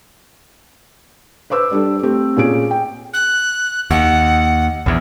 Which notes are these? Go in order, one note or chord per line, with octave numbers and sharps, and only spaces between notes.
B4 C5 D6 E6
G3 D4 A4
A3 C4 G4
A#2 C#4 G#4 D7
G5
F#6
D#2 F#5
A#1 E2